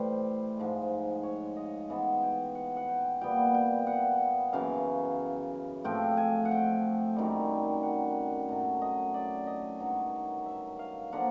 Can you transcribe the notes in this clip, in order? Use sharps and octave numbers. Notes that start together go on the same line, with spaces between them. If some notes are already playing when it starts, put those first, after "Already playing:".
Already playing: A2 E3 G3 C5
G#2 F3 G#3
C#5
D#5
C#3 E3 G#3 B3 E5
G5
F#5
F#5
G5
A#2 G3 B3 G5
G5
F#5
F#2 C#3 E3 F5
A2 F3 A3 C4 G5
G#5
F#5
G5
F#2 D#3 G3
F#5
A2 F#3 A3
D#5
D5
D#5
G2 D#3 F#3
E5
F5
D3 F3 A#3 F#5